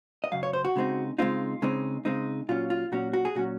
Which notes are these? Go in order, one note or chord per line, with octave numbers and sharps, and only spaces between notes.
D#5
F#2 C#3 F#3 F5
C#5
C5
F#4
C#3 G#3 C4 D#4
C#3 G#3 C4 D#4 F4
C#3 G#3 C4 D#4
C#3 G#3 C4 D#4
A#2 F#3 C#4 F4
F4
A#2 F#3 C#4 F#4
F#4
G#4
A#2 F#3 C#4 F#4